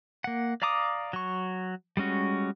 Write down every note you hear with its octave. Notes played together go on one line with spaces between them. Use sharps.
A#3 F#5
D5 F5 A#5 D6 D#6
F#3 C#6
G3 G#3 C#4 F#4